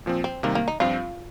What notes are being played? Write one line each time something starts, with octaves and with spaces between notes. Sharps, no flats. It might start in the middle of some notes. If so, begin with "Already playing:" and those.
A#2 F3 C4
C4
C3 D#3 G3 A#3
A#3
D#4
G2 F3 C4 F4